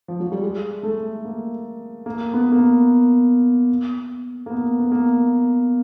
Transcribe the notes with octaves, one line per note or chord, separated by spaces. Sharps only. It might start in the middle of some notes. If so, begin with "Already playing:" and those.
F3
F#3
G3
G#3
A3
A#3
A#3
B3
A#3
B3
A#3
B3
B3
A#3